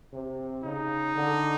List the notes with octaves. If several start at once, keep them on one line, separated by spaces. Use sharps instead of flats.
C3
C#3 D#4
D3